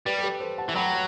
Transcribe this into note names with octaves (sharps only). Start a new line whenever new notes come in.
G3 G4 B4
A4
G4 B4
A4 C5
F#5 A5
E3
F#3 G5 B5